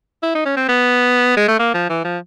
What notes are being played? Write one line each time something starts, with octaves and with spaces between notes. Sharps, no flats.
E4
D#4
C#4
C4
B3
G#3
A3
A#3
F3
E3
F3